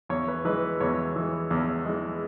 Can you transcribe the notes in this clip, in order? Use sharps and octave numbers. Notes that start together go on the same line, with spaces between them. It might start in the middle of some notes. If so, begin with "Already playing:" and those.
E2 C#5
B4
E3 G#3 B4
E2 C#5
E3 G#3
E2
E3 G#3